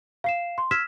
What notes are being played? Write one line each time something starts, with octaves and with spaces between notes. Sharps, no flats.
F5 C7 E7
C6
E6 F6 G#6 B6 E7